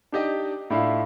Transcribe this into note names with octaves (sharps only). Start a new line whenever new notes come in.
D4 D#4 G4 D5 D#5
A2 D4 E4 F4 F5